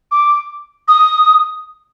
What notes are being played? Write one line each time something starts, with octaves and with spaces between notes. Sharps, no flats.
D6
D#6